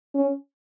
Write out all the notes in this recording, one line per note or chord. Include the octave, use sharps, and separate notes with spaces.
C#4